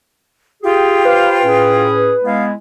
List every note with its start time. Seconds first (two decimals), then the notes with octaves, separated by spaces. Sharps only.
0.63 F4 G4 G#4 G5
1.05 G4 B4 C5 F5
1.44 A2 C#4 G#4
2.23 G#3 B3 E4 F5